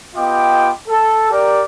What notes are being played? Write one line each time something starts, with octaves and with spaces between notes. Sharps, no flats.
B3 F4 G4 D#5 G5 D6
A4
G4 A#4 D5